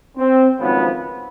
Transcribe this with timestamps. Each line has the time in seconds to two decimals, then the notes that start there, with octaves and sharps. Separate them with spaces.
0.18 C4
0.59 G#1 F#2 C#3 F3 B3